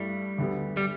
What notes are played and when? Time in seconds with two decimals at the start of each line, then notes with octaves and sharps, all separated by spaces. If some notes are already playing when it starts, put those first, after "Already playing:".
Already playing: G2 G3 A3 E4
0.38 D2 D3 B3 G4
0.77 G3